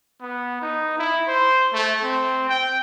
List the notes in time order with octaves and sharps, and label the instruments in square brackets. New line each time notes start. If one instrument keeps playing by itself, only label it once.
[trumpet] B3
D#4
E4
C5
A3
C4
G5